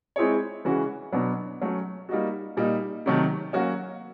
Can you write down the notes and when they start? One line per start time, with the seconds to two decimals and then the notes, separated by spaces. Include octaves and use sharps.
0.16 G#3 C4 E4 G#4 C#5
0.65 C#3 E3 G#3 C#4 F#4
1.12 B2 F#3 B3 D4
1.61 F#3 A3 C#4
2.09 G3 A#3 D#4 F#4
2.57 A#2 G3 A#3 D#4
3.06 C3 D#3 F#3 A3
3.53 F#3 A#3 C#4 F#4